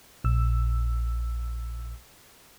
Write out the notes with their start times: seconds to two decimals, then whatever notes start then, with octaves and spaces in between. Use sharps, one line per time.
0.24 A#1 E6